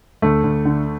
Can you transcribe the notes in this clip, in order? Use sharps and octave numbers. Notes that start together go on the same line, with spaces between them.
D2 A3
D2
D3